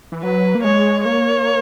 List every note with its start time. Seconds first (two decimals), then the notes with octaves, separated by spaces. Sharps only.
0.12 E3
0.23 F#3 B4
0.55 A#3
0.64 G#3 C#5
1.04 A#3 C#5